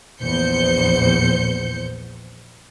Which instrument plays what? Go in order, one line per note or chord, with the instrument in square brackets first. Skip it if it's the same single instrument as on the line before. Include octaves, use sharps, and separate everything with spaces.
[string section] A#1 E2 C5 G6 C#7